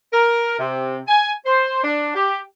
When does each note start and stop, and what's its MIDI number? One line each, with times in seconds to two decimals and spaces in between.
0.13 0.56 70
0.59 0.99 48
1.08 1.31 80
1.46 1.81 72
1.84 2.13 62
2.15 2.40 67